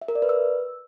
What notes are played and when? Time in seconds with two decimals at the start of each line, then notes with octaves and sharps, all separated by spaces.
0.02 E5
0.08 A#4
0.15 D5
0.22 B4
0.29 E6